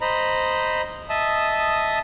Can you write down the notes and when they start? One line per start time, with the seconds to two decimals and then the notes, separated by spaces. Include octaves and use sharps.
0.01 C5 D#5 A#5 B5
1.09 D#5 E5 A5 D#6